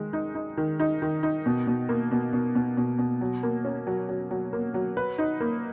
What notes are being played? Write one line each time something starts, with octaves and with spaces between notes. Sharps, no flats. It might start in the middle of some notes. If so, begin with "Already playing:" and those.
Already playing: D#3 G#3
D#4
D#4
D#3
D#4
D#3
D#4
B2
B2
A#3
B2
B2
B2
B2
B2
F#3
A#3
C#4
F#3
F#3
F#3
A#3
F#3
B4
D#4
A#3